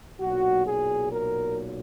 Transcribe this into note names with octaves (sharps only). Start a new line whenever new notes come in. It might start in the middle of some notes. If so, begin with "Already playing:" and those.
B1 A#2 F#3 F#4
G#4
A#4